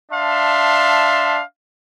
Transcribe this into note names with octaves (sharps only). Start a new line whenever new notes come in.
D4 E5 F5 A5 C6